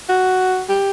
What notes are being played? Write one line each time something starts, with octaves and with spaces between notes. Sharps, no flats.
F#4
G4